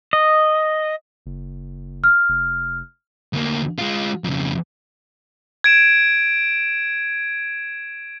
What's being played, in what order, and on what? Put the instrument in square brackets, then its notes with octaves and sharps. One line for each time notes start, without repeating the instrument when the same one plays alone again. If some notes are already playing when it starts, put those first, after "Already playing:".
[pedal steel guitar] D#5
[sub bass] F#1
[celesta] F6
[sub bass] F1
[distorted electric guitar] D2 A#3
G#3 F4
F2 C#3
[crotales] G#6 D7 E7